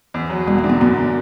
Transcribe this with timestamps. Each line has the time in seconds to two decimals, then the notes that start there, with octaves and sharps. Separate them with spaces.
0.14 E2
0.30 F#3
0.47 E1 G3
0.58 A3
0.64 D3
0.69 B3
0.81 F#2 B3